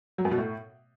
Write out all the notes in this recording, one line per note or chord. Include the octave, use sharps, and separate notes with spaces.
F#3
F#2
B2
A2